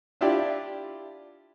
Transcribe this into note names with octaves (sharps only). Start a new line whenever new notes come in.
D4 E4 F4 G4 D5